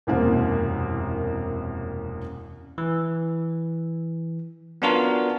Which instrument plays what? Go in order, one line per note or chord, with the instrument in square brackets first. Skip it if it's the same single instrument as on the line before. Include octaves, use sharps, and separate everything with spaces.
[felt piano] E1 C2 F#2 A#3 C4
[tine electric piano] E3
B3 C#4 D4 F4 F#4 A#4